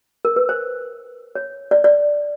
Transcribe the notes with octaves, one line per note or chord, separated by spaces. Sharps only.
A#4
B4
C5
C#5
D5
D5